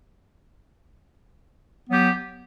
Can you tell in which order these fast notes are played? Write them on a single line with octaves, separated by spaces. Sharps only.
B3 F#3 G4